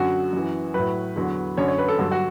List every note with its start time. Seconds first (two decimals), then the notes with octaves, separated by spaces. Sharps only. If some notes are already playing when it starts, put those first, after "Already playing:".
Already playing: F#2 D3 F#3 F#4
0.33 F#2 E3
0.74 A2 F#3 B4
1.16 E2 D3 F#3
1.57 F#2 D3 F#3 C#5
1.68 C#5
1.78 B4
1.88 A4
1.99 G2 D3 F#3 A4
2.12 F#4